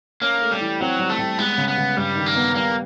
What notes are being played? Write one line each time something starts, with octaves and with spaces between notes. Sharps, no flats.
A#3 C#4
A3
G3
E3
F#3 C4
G3
A3
G3
G#3 B3
C#3
B3
C#3
G2 G3
D#3
A#3
B3
G3 A#3